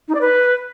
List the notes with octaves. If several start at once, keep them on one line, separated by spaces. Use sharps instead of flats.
D#4
D5
B4